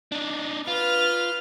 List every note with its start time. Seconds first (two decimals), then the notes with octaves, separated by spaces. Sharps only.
0.12 D4 D#4
0.68 F4 B4 F6